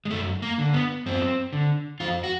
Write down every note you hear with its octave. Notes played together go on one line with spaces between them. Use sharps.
G#3
F#2 A3
A#3
D3
B3
F#2 C4
D3
F2 F4
F#4